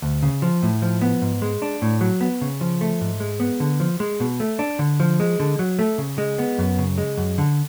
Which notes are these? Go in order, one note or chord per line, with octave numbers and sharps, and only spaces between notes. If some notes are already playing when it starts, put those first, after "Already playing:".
D2
C#3
F3
A2
F3
B3
G#2
G#3
D4
A2
F#3
B3
C#3
F3
A3
G#2
G#3
B3
D3
F3
G#3
B2
A3
D4
D3
F3
G#3
D3
F#3
A3
C#3
G#3
B3
F#2
C#3
G#3
F#2
D3